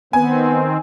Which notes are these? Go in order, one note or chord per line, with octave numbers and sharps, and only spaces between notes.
D#3 B3 C4 G#5